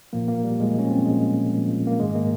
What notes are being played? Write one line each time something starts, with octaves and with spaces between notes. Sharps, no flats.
A#2 F3 A#3
A#3
G3
A#2 F3 G#3
C#4
C4
A#2 F3 G#3
A#2 F3
A#3
G#2 D#3 G#3
A#3